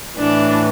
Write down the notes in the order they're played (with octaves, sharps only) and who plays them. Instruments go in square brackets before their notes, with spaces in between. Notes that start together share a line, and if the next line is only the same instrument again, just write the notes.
[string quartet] A2 E3 D4